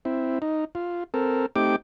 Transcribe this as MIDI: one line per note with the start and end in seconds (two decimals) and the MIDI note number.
0.05 0.39 60
0.05 0.39 64
0.42 0.65 63
0.75 1.04 65
1.14 1.46 60
1.14 1.46 69
1.14 1.46 70
1.56 1.76 57
1.56 1.76 60
1.56 1.76 63
1.56 1.76 67
1.56 1.76 79
1.56 1.76 86